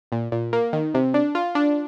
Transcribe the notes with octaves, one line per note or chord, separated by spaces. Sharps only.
A#2
A#2
A#3
D#3
C3
D4
F4
D4